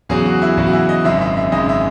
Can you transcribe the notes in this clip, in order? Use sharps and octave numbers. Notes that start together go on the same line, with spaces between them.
E2 C#3 F#3 G#4
F#4
E4
E2 C#3 F#3
F#4
E4
D#5
G#1 F#2 C#3 G#3 E5
E5
E5
G#1 F#2 C#3 G#3 D#5
E5